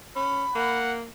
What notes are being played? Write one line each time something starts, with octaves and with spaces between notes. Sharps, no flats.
C#4 B5
A#3 F#5